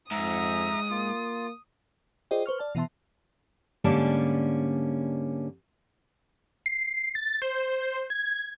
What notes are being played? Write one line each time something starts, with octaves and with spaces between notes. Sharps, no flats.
F2 G#2 E5 A#5 D#6
A#3 F4
F4 G#4 C5 D5 D#5 G5
B4 C5 C#6 F6
D5 A5 F6
B2 E3 B3 E5 A5 C6
G#2 D3 G3 A#3 C#4 A5
C7
A6
C5
G#6